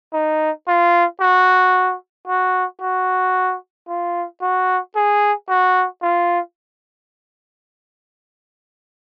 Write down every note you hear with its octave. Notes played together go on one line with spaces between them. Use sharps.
D#4
F4
F#4
F#4
F#4
F4
F#4
G#4
F#4
F4